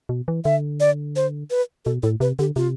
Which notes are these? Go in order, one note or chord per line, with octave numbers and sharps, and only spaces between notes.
B2
E3
D3 E5
D5
C5
B4
B2 A4
A2 A4
C3 B4
D3 G4
C3 F4